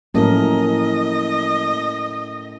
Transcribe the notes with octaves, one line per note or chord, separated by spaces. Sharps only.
A2 F3 F#3 A#3 C#4 A#4 D#5